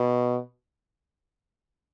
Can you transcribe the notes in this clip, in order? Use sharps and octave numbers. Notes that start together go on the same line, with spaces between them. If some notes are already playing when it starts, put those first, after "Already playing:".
Already playing: B2